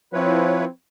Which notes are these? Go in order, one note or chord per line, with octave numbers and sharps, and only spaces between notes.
F3 C4 E4 B4 C#5